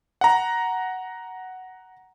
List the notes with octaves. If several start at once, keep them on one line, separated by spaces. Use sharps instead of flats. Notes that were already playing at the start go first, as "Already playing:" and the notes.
F#5 A#5